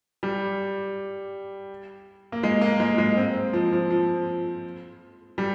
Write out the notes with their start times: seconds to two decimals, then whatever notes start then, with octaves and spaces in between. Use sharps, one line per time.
0.23 G3
2.32 A#3
2.43 G#3
2.61 A#3
2.80 G#3
2.98 G#3
3.17 C4
3.53 F3
3.73 F3
3.90 F3
5.38 G3